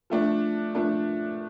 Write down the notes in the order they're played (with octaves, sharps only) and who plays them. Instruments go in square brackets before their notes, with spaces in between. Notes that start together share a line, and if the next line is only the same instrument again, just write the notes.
[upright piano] F3 A3 D4
F3 A3 D4